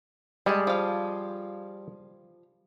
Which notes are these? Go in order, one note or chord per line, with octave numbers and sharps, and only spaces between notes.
G3 G#3 G#4 A5
F3 F5